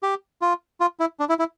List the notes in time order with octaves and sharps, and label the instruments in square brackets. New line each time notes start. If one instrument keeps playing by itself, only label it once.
[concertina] G4
F4
F4
E4
D4
E4
E4